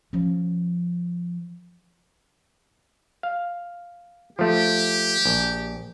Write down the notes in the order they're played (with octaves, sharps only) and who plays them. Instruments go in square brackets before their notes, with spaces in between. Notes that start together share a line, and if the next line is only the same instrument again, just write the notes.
[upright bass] F3 C#4
[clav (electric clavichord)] F5
[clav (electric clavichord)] F3 A3 [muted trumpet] G4
[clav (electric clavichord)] A#1